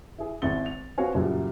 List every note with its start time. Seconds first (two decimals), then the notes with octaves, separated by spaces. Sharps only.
0.18 E4 G#4
0.42 G#1 G#2 E4 A6 G7
0.66 F7
0.98 B3 C4 F#4 C#5 F5 G#5
1.15 F#2 A#2 C#3 F#3 G3 E4